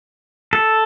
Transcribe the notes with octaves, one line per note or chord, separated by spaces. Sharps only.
A4